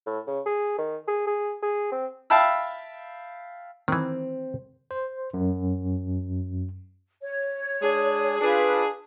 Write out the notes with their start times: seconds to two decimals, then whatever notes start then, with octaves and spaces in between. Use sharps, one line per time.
0.06 A2
0.27 C#3
0.46 G#4
0.78 D#3
1.08 G#4
1.27 G#4
1.63 G#4
1.92 C4
2.30 E5 F5 G5 A5 B5 E6
3.88 D#3 E3 C4
4.91 C5
5.34 F#2
7.22 C#5
7.82 G#3 D4 G#4
8.41 D4 F4 G#4 B4